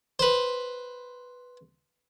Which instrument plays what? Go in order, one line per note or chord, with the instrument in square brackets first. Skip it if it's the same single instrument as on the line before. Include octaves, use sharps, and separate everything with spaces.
[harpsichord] B4 C5